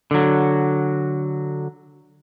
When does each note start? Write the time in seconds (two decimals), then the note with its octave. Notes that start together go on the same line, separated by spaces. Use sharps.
0.11 D3 F#3